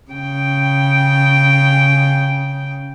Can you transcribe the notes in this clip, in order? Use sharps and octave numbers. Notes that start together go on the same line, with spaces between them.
C#3 G5